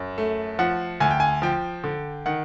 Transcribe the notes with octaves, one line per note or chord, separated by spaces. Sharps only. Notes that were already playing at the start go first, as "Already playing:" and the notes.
Already playing: F#2
A3
F3 F#5
D2 G#5
G5
G#5
F3 G5
D3
D#3 F#5